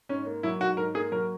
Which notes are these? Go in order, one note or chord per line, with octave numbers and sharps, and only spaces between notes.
G#2 C#4
A#3
F#3 E4
G#2 F#4
G#2 A#4
A#3 G#4
F#3 A#4